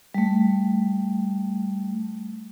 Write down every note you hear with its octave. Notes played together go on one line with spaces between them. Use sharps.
G3 A3